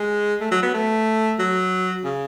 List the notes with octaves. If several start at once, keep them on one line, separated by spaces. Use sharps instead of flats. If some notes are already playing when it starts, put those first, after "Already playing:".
Already playing: G#3
A3
F#3
B3
A3
F#3
C#3